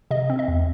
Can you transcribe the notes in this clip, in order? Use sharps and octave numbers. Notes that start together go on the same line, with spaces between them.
C3 D#5
C4
D#5
E2